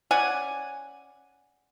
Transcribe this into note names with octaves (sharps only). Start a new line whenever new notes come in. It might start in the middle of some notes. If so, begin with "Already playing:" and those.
C#4 D5 F#5 G#5